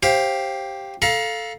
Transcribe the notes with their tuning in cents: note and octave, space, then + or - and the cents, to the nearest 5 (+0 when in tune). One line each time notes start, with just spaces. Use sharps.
G4 +0 C5 +25 F5 +0
A4 +0 F5 +0 A#5 +35